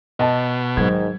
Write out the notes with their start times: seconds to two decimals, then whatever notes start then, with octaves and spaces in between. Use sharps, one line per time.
0.19 B2 D#5 A5
0.77 G#2 D#3 F#3 G#6